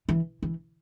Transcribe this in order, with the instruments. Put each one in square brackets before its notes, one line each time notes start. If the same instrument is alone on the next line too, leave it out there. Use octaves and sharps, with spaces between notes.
[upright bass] E3
E3